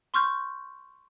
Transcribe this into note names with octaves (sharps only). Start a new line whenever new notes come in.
C6 C#6 F6 G6